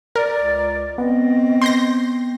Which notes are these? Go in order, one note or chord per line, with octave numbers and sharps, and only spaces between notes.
A#4 D5
C#2
B3 C4 D#5
C6 G6 A#6